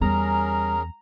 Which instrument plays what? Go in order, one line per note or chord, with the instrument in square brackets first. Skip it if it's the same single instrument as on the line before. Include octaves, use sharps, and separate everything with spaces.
[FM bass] E2 [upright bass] G3 [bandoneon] C#4 G#4 A#4 [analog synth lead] A#5